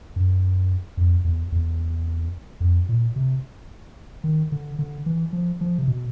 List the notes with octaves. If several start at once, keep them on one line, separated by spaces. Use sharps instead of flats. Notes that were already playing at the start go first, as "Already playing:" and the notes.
F#2
F2
E2
E2
F2
A#2
C3
D#3
D3
D3
E3
F3
F3
C3
B2